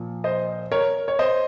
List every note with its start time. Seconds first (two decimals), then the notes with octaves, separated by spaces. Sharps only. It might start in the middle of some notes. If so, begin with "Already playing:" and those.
Already playing: A#2 F3
0.24 C5 D#5
0.72 A#4 C#5
1.08 C#5
1.19 C5 D#5